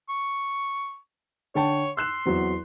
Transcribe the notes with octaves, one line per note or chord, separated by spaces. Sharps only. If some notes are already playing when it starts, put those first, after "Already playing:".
C#6
D3 C#5 G5 A5
C6 E6 F#6 E7
E2 F#3 C4